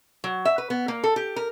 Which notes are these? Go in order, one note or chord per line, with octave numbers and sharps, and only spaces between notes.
F#3
E5
B4
B3
A#3
A4
G4
A#4